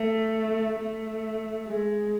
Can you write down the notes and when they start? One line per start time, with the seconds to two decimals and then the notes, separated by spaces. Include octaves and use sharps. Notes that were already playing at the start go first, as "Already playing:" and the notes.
Already playing: A3
0.79 A3
1.67 G#3